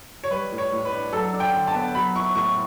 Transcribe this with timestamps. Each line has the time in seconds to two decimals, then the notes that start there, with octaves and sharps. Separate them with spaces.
0.24 C#5
0.31 G3 B4
0.52 A2
0.58 C#5
0.73 A2
0.85 B4
0.92 D4
1.13 F#3 A4
1.34 D4
1.40 G5
1.54 D3
1.67 A5
1.74 B3
1.95 F#3 B5
2.15 E4 C#6
2.35 A2 C#6